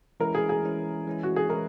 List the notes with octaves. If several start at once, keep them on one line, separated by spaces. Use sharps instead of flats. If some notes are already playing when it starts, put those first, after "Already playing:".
E3 G#3 C#4 E4 A#4
G#4
G#4
E3 G#3 C#4 E4
E3 G#3 C#4 E4
F#4
G#4
E3 G#3 C#4 E4 A#4